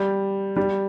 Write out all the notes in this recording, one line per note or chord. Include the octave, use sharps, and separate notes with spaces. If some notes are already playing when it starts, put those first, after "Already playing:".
Already playing: G3
G3